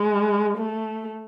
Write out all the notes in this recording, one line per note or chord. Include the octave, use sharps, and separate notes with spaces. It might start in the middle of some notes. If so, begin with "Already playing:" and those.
Already playing: G#3
A3